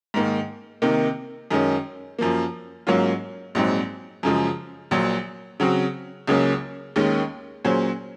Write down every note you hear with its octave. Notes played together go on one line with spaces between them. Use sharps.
G#2 D#3 A#3
C3 D#3 A#3
F#2 D#3 G#3 C#4
F#2 F3 A#3
G#2 F#3 A#3 C#4 F4
A#1 G#2 F#3 C4 D#4
F#2 C#3 F3 G#3
A#1 A#2 F#3
C#3 F#3 C4 F#4
C#2 C#3 F#3 A#3 C#4
D#2 D#3 G#3 C#4
A#2 F#3 C#4 G#4 C5